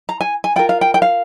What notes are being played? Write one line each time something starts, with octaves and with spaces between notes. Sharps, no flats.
A#5
G#5
G#5
F4 A#4 G5
F5
G5
G5
F5